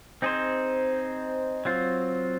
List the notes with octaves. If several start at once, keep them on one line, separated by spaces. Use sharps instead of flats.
C4 D#4 G#4 C5
F#3 C4 F4